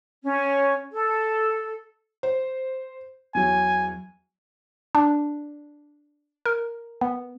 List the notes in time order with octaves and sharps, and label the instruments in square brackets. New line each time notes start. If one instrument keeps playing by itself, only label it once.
[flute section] C#4
A4
[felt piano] C5
[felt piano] E2 F#3 [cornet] G#5
[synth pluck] D4
A#4
B3